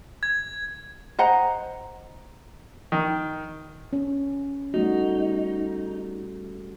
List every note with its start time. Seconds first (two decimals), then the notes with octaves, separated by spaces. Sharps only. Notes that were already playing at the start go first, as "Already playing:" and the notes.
0.23 G#6
1.19 C5 D#5 F#5 A#5
2.92 D#3
3.93 C#4
4.74 G3 A3 D#4 F#4